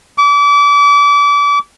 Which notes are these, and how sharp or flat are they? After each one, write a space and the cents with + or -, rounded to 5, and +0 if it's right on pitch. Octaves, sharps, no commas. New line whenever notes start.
D6 -30